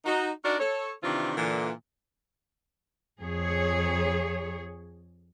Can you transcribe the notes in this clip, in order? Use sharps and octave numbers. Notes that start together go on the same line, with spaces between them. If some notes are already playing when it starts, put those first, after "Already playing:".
D#4 F#4
D4 D#4 F#4 A#4 D5
A4 C#5
C3 D#3 E3 C4 D4 F4
A#2 D3 E3
F2 G#4 C#5